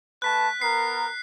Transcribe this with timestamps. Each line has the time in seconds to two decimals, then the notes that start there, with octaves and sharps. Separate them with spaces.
0.22 A3 B4 A5 F#6 B6
0.62 B3 A#4 C7